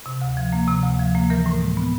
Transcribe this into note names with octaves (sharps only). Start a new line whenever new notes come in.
C3
D2
F3
A#3
C3
D2
F3
A#3
E3 A#4
A2
G#3
B3